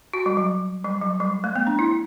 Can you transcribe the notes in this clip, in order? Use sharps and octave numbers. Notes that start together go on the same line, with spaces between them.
F#4
G3
F#3
G3
F#3
G3
A3
B3
D4
E4